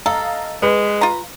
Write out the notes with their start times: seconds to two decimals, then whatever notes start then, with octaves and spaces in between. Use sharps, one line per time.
0.06 A4 D#5 F5 A#5
0.62 G#3 B4
1.01 F4 A#5